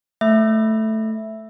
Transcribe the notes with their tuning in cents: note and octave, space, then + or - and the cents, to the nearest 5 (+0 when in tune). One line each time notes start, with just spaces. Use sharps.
A3 +0 E5 +0